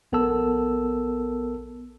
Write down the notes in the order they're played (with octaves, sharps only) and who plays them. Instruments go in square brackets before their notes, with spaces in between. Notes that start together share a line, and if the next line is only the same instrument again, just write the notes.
[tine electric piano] A#1 B3 A4 A#4 A5 E6